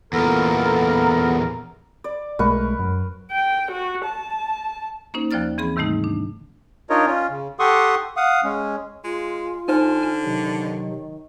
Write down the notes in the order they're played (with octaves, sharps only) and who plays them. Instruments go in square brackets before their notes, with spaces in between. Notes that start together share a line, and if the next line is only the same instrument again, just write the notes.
[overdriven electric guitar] E2 A#2 [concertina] B3 [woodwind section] A4 A#4 A#5
[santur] D5
[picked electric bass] B1 G#3 A3 [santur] A#4 B4 C#6
[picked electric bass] F#2
[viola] G5
F#4
A5
[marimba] A#3 C#4 D#4 C5
D#2 F3 C5 D5 F6 A6
E3 C4 G#4 B5
G#2 C3 D#3 G3 A3 D#4
D4
[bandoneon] D4 D#4 F4 A#4 C#5 D#5
C#4 F4
C#3
G4 A4 F#5 C6 C#6 D#6
F5 F#5 D#6
G#3 C#4
[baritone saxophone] G#3 [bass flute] F4
[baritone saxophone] D3 [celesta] D#4 C5 [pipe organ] G#5 A5 F6
[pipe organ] C3 F#3 [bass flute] D#3